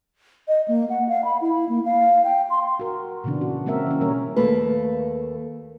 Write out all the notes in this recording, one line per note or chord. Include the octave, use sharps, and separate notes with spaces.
D#5
A#3
F#5
F5
B5
E4
A#3
F5
G5
C6
F#4 A#4
A#2 C#3 E3 B3 D4
F#4
G#3 A#3 C4 C#4 A#4 E5
E3 C#4
B2 E3 G3 A#3 A#4 C#5
D#2 A3 A#3 B4